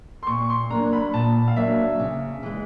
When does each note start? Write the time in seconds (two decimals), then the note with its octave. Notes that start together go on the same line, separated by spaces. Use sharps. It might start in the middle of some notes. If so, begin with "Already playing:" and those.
0.23 C6
0.27 A#2 C#6
0.50 C6
0.70 F#3 A#3 D4 A#5
0.93 B5
1.13 A#2 A5
1.48 F5
1.56 F#3 A#3 D4 E5
1.99 C#3
2.43 E3 G#3